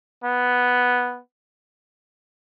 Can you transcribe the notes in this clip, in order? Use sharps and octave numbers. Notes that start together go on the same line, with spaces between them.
B3